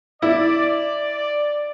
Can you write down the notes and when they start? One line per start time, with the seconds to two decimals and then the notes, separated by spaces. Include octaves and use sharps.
0.22 E4 D5